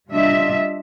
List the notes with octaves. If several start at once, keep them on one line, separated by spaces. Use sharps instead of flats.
G3 D4 F4 D#5 E5